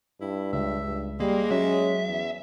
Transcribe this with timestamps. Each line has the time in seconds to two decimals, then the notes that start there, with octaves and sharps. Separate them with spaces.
0.21 G2 E4
0.53 C#2 E5
0.86 G2
1.20 G3 G#3 A#3
1.51 F#3 C#4 E5
2.07 E2